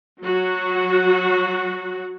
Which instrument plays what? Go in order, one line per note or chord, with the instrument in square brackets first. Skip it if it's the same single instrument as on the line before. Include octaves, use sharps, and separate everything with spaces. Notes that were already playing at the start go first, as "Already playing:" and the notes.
[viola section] F#3 F#4